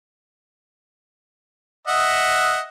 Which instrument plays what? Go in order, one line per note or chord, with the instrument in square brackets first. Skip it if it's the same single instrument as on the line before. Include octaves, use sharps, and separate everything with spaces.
[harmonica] D#5 E5 F#5